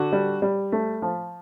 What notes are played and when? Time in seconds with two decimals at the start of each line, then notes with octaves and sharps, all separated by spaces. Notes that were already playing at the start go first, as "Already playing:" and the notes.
Already playing: D3 F#4
0.12 G3
0.42 G3
0.72 A3
1.02 F3